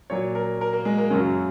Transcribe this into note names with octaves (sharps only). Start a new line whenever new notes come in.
A#2 F#3 C#5
A#4
A#4
A#3
G#3
A#3
F#2 C#3 F#3 C#4